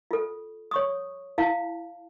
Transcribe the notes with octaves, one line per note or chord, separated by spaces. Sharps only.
F4 A4
C#5 C#6 D#6
E4 F5 A5